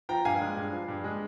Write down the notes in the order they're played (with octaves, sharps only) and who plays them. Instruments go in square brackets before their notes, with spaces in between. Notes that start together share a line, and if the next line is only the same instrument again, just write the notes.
[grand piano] F3 G5 A#5
G2 F5 G#5
G#3
G2
F3
G2
G#3